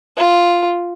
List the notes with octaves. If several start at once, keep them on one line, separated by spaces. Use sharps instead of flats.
F4